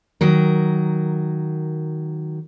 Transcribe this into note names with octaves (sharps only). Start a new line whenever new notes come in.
D#3 F#3 A#4